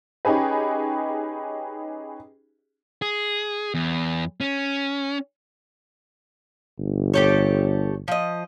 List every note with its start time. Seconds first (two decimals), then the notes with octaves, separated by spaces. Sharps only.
0.25 C#4 D#4 G4 G#4 B4
3.02 G#4
3.74 E2
4.41 C#4
6.78 G1
7.14 G4 A4 C#5
8.08 F3 D#5